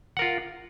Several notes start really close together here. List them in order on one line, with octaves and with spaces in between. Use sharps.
F#5 A#4 F4